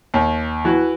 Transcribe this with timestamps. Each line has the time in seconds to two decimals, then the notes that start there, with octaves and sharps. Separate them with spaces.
0.14 D#2
0.65 E3 F#4